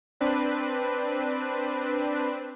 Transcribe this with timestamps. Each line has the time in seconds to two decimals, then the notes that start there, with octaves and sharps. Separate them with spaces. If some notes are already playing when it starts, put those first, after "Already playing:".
0.21 C4 D4 B4